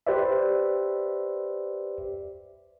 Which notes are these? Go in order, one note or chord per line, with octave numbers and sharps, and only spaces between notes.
G4 B4 C5 D5 E5